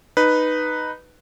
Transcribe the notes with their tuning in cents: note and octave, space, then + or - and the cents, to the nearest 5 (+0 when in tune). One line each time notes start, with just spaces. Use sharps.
D#4 -10 B4 +0